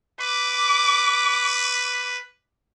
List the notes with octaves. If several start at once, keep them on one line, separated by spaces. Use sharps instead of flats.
B4 D6